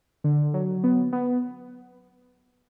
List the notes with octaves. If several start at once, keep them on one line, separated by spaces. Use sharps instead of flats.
D3
F#3
B3
B3